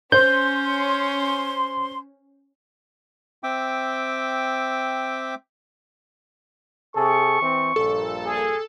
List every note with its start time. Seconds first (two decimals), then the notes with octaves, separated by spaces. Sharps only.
0.12 C#4 C5 C6 G6
3.43 C4 E5 G5 D6
6.94 C3 G#4 A4 C#6
7.42 E3 C4
7.76 A#1 G2 A#2 A4
8.24 G#4